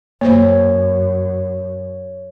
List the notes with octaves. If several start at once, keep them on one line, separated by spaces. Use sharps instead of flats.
F#2 A#3 C5 C#5